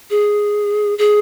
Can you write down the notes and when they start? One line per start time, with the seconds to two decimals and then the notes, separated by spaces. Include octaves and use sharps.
0.10 G#4
0.98 G#4